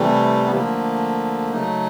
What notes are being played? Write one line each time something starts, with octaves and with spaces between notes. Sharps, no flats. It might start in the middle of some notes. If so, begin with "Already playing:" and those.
Already playing: C3 E3 G3 A3
B3
D3 F3 A3 A#3
C#3 F#3 A3 D#4